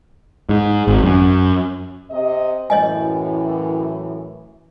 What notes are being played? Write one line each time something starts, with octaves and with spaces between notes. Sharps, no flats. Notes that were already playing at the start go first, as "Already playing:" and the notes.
G#2
G#1
F#2
C3 D#5
F#2 A2 E3 C#5 D#5 G#5